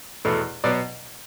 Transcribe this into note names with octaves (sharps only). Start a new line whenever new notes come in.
E2 B2 A3
B2 F#3 B3 D5